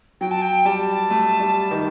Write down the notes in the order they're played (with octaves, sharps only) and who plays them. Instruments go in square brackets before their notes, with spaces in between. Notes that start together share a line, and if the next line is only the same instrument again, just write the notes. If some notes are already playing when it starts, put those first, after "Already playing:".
[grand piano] F#3 [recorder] G5
[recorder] A5
G5
[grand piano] G3 [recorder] A5
[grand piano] A3
G3
D#3